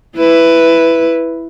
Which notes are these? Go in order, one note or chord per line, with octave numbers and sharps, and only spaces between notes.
E4 B4